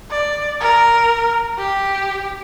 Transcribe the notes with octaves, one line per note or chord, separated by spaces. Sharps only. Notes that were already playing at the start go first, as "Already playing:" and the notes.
D5
A#4
G4